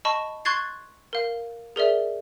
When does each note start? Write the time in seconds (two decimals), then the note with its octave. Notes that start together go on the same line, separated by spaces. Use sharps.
0.05 D#5 A5 B5 C#6
0.45 C6 C#6 F#6 G#6 A6 C7
1.13 A#4 F5
1.76 G#4 A#4 D5 E5